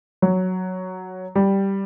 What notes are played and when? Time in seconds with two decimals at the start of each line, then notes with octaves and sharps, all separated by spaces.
0.22 F#3
1.36 G3